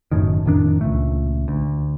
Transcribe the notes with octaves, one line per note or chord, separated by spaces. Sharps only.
F#1 F#2 A2 D#3
F2 A2 D#3 D4
C#2 A#2 A3
D2